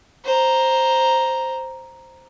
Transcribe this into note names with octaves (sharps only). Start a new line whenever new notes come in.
C5 A#5